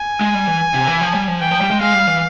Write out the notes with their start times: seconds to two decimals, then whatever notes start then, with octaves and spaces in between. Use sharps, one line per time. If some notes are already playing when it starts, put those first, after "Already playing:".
Already playing: G#5
0.21 G#3
0.34 G3
0.47 E3
0.74 C3
0.88 E3
1.01 F3
1.14 G3
1.28 F3
1.41 E3 G5
1.51 F3
1.61 G3
1.71 G#3
1.81 G#3 F5
1.94 G3
2.07 E3